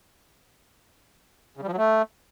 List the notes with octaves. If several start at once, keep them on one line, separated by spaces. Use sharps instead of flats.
C#3
G3
F3
F#3
A3